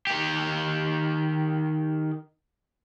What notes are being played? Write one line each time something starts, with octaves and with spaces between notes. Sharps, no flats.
D#3 G4